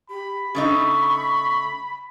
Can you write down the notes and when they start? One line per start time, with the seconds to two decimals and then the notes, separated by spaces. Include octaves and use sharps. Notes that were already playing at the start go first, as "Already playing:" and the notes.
0.10 G4 B5
0.55 C#3 A3 D#4 C#6